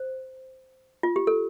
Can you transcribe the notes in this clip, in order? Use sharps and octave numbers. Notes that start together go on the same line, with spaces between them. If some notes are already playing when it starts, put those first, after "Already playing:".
Already playing: C5
F4
G4
A4